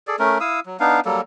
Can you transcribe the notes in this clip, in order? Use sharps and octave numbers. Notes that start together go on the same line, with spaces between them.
G#4 A4 D5
A3 C#4 A#4
E4 F5 D#6 E6
F#3
B3 D4 D#4 F5
F#3 G3 A#3 A4